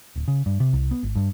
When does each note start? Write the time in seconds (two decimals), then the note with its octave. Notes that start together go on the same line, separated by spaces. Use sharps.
0.16 D1
0.28 C#3
0.46 G2
0.60 C3
0.73 C2
0.91 B3
1.03 G#1
1.16 G2